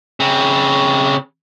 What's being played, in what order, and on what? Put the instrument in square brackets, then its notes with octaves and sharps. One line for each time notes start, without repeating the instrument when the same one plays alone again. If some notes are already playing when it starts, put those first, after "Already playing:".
[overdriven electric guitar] C#3 C4